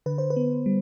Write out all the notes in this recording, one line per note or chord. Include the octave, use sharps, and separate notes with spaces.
D3 B4
C5
B4
B3
G3